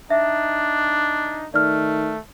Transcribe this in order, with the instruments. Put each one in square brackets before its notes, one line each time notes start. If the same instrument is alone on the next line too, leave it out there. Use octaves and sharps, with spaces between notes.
[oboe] D4 [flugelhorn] D#4 [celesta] E5
[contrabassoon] D#3 [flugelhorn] A3 [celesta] D5 F6